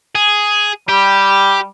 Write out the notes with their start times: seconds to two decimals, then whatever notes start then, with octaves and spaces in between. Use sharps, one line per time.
0.15 G#4
0.89 G3 G4